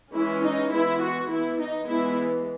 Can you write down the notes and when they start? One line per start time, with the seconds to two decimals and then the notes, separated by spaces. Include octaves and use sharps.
0.14 E3 G#3 C#4 E4
0.43 D#4
0.72 E3 G#3 B3 E4
1.00 F#4
1.29 E3 B3 E4
1.59 D#4
1.87 E3 G#3 B3 E4